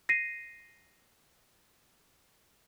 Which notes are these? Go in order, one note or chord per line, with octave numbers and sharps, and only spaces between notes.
A#6 C7 D#7